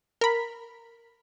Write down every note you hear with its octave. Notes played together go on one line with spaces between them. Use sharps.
A#4 B5